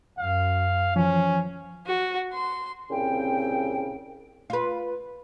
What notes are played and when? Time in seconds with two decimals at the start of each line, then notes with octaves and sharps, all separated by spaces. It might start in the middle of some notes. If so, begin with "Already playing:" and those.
0.19 F#2 F5
0.96 E3 F3 C#4
1.86 F#4
2.33 C6
2.91 C2 A#2 C#3 C4 G5
4.50 F4 B4